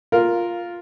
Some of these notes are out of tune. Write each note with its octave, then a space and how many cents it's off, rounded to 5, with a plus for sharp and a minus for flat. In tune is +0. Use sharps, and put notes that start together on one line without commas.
F4 +0 A#4 +0